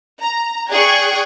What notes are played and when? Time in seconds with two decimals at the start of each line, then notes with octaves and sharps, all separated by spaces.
0.21 A#5
0.71 G#4 D5 G5 C#6 F#6 G#6